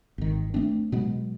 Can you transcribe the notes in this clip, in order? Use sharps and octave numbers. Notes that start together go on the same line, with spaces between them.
G#1 D#3
A3 C4 D4
B2 F#3 G#3 B3